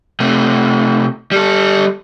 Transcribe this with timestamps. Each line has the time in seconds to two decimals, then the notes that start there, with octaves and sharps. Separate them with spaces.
0.20 C3 A3
1.32 G3 A4